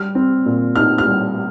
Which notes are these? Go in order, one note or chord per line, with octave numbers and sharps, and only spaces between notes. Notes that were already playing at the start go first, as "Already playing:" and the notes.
Already playing: G3 F6
C4
A#2
D#4 F6
F6
G3